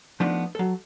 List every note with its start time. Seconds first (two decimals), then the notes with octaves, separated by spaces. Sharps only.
0.20 F3 A3 B3 D4 D#4
0.55 F#3 A4